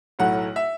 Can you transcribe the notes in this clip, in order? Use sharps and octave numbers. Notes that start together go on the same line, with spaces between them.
B1 A2 F#3 A3 F#5
E5